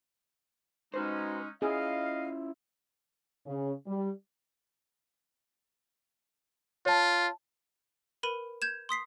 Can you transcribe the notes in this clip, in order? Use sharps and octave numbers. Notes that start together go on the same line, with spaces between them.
G#3 C#4 D#4 F#4 B4 C5
C#4 E4 F4 G#4 D#5 F5
C#3
G3
F4 C#5 A5
A#4 B4 B5 D#7
G6 G#6 E7
C6 D#6 B6 C7